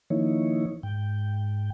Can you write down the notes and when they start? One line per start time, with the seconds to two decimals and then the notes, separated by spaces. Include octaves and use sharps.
0.10 D#3 F3 A#3 D#4 E4 C#5
0.83 G#2 G5